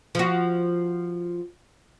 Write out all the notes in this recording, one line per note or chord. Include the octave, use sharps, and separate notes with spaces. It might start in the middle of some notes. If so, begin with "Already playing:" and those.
F3 F#4